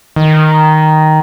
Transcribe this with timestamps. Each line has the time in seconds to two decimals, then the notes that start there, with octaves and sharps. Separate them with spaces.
0.16 D#3